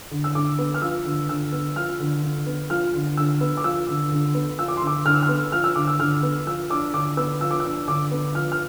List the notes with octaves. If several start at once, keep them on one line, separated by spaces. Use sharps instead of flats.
D3
E6
D3 D6
B3
F6
F3 E6
D3
D3 E6
B3
F3 F6
D3
D3
B3
F3 F6
D3
D3 E6
B3
D6
F3 E6
D3
D3
B3
F3 E6
D6
D3 C6
D6
D3 F6
E6
F6
B3
F3 F6
E6
D3 D6
E6
D3 F6
B3
F3 E6
D4 D6
D3 D6
B3 E6
F3 E6
D6
E6
D4
D3 D6
B3
F3 F6
F6